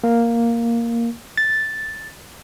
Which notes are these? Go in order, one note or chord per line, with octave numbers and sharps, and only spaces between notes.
A#3
A6